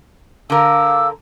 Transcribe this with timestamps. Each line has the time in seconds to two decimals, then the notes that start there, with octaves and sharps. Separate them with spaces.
0.50 D3 A#4 F5 D6 E6